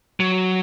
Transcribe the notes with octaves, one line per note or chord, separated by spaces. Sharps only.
F#3